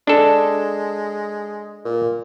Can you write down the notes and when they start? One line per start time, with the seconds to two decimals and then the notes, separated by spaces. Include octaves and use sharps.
0.07 G#3 D4 A4
1.85 A#2